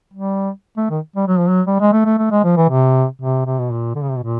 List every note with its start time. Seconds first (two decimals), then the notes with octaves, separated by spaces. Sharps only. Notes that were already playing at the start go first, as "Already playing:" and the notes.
0.14 G3
0.77 A3
0.90 D#3
1.16 G3
1.27 F#3
1.39 F3
1.49 F#3
1.67 G3
1.80 G#3
1.93 A3
2.05 A3
2.19 A3
2.31 G#3
2.44 F3
2.57 E3
2.70 C3
3.21 C3
3.46 C3
3.59 B2
3.72 A#2
3.95 D3
4.02 C#3
4.09 C3
4.17 B2
4.23 A#2